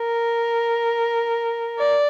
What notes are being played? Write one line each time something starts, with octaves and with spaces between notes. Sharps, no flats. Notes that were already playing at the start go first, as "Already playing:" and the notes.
Already playing: A#4
D5